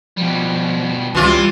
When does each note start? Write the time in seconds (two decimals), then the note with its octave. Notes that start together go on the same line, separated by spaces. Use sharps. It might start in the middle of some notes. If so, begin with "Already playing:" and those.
0.17 B2 F3 G3
1.15 C#2 E3 G3 F4 G4 D5